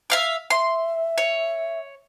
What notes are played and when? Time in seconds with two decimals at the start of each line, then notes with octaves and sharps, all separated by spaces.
0.10 E5 F5 D6
0.50 E5 C6
1.18 C#5